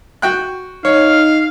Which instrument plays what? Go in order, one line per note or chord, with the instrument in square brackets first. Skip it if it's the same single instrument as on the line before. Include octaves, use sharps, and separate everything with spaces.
[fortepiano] F#4 G5 F#6
[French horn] D#4 [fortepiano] C#5 [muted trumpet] F5